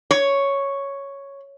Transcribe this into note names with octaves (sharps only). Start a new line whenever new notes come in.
C#5